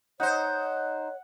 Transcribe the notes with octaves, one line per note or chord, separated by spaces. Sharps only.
D#4 C5 C#5 F#5